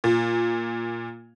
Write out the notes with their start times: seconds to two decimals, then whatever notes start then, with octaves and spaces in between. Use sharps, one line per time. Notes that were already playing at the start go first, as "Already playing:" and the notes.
0.04 A#2